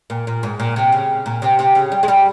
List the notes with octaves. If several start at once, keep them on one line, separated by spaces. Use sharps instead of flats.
A#2
A#2
G#2
A#2
C3
C#3
A#2
C3
C3
C#3
G3
G#3
G3